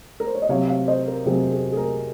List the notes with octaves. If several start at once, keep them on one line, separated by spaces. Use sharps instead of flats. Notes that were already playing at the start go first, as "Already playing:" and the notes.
A#4
C5
C#5
D#5
C3 F#3 C4 C#5 F5
C#5 F5
C5 D#5
A#4
C3 F#3 C4 G#4
G#4
G#4
A#4